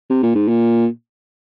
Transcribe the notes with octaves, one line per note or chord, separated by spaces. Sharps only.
C3
A#2
G#2
A#2